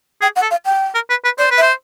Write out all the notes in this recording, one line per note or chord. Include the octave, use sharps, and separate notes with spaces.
G#4 G5
F#5
A4
F5
G5
A#4
B4
B4
C5 D5
B4
E5
C5